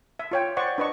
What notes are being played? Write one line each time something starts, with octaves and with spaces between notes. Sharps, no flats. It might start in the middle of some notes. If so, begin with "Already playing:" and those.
E5
F4 C#5 G5
C5 D5 F#5 C#6
D4 B4 D#5 C#6